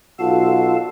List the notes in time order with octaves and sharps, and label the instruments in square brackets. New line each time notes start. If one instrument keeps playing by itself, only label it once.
[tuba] B1 [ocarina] F4 [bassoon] F#4 [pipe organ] A4 F5 A5